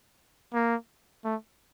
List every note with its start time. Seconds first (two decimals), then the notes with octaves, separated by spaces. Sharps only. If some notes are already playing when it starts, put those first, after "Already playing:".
0.54 A#3
1.24 A3